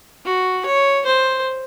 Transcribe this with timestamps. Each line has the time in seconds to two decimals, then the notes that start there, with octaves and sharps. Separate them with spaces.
0.25 F#4
0.65 C#5
1.06 C5